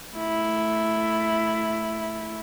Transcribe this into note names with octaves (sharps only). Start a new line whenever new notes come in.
A3 E4